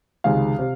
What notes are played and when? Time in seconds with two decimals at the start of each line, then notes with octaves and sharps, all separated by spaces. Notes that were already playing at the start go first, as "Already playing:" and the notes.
0.24 C#2 C3 D#3 G#3 F5
0.59 C3